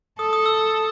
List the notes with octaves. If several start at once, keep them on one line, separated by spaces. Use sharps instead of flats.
A4 D#6
D#6
E6